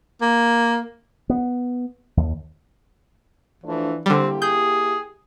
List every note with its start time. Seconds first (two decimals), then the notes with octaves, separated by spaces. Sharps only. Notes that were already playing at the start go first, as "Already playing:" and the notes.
0.21 A#3
1.30 B3
2.17 D#2
3.64 E3 F3 A3 D4
4.06 D3 G3 A#3 C4 E4 G4
4.42 G#4 G6